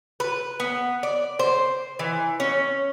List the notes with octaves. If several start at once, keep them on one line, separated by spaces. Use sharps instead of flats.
B4
B3
D5
C5
E3
C#4